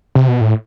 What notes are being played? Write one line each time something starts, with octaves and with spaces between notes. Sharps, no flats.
C3
B2
A2